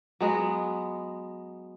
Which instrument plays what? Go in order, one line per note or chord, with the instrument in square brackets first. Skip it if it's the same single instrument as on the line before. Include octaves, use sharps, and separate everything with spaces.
[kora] F#3 G#3 B3